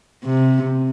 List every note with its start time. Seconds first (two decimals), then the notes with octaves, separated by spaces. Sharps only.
0.24 C3